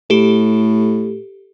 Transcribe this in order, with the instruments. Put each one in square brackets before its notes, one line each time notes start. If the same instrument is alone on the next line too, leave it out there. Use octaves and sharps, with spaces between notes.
[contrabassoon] A2 [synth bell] G4 A4